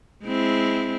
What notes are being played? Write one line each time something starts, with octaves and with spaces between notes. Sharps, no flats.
G#3 C4 E4